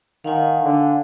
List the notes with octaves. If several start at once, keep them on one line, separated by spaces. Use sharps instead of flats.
D#3 F5 F#5 G#5
D3